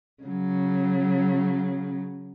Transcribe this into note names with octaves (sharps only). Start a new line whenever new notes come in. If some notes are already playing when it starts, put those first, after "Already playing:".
C#3 F#3